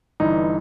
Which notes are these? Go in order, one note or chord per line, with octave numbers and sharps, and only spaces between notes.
G1 G2 E3 D#4